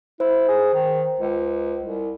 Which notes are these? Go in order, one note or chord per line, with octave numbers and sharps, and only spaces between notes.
E4 C5
G#4
D#3
C#2
C2